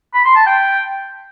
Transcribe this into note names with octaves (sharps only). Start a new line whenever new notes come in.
B5
C6
A5
G5